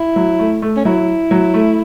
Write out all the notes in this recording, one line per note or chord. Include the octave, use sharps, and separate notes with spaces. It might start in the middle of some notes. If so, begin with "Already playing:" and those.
Already playing: E4
F#3
A3
A3
C#4
F#3 E4
F#3
A3